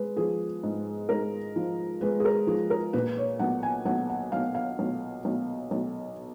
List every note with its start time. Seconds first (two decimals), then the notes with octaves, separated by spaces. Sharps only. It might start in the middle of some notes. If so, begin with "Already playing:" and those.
Already playing: G#3 B4
0.17 F3 G#4
0.63 G#2
1.09 G#2 A#4
1.56 F3
2.01 G#3 B4
2.20 G#4
2.25 A#4
2.47 F3 G#4
2.70 A#4
2.93 A#2 B4
3.17 C#5
3.39 B1 F#5
3.63 G#5
3.85 B1 F#5
4.09 F#5
4.32 B1 F5
4.55 F5
4.79 B1
5.25 B1
5.71 B1